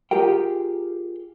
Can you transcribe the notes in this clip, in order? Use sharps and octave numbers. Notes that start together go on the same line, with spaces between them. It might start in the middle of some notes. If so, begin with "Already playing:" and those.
F4 G4 G#4 A#4 G5